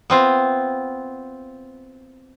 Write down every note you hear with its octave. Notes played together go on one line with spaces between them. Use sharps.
B3 C4 F4